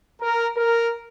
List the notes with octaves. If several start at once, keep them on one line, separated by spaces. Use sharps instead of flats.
A#4
A#4